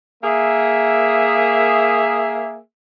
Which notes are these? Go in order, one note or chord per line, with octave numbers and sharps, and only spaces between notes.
A#3 G#4 E5